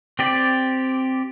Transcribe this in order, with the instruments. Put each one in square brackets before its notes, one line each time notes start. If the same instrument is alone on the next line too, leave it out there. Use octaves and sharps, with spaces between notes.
[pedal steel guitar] C4 G4 D5